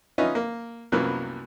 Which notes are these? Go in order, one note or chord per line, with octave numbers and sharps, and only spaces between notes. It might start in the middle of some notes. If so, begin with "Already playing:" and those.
C#4 D#4 F4 B4 D#5 E5
A#3
C2 F#2 F3 F#3 A#3 B3